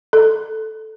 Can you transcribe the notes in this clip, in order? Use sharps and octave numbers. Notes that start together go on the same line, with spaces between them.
A4